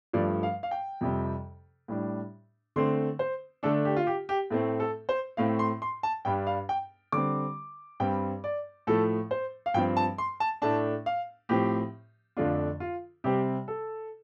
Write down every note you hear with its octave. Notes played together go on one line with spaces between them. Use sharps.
G2 F3 A3 D5
F5
F5
G5
F2 C3 G3
A2 G3 D4
D3 A3 C4 C6
C5
D3 A3 D4 A4
G4
F4
G4
G4
A2 A3 C4
A4
C5
A2 A3 C4 F5
C6
C6
A5
G2 G3 D4 G5
F5
G5
D3 G3 C4 D6
G2 G3 C4 G5
D5
A2 F3 A3 A4
C5
F5
G2 F3 C4 G5
A5
C6
A5
A2 A3 D4 A5
F5
A2 F3 C4 G4
F2 D3 A3 D4 F4
F4
C3 G3 C4 G4
A4